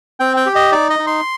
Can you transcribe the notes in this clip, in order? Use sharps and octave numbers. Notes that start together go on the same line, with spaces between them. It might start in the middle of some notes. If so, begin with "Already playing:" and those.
C4 G5
G5
G4
D#5
D#4 D5
D#5
D#4
C6